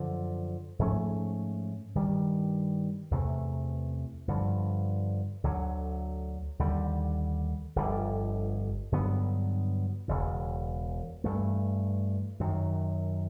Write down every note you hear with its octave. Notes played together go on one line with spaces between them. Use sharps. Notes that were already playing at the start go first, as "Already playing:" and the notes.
Already playing: F#2 D3 F3
G#2 F3 A3 C#4
G2 D#3 G3
E2 C3 E3 A3
G2 D3 F3
D2 D3 F#3
D#2 D3 G3
G1 F2 D3
G2 D3 F#3 B3
E1 E2 C#3
G2 E3 A3
F#2 D#3 F#3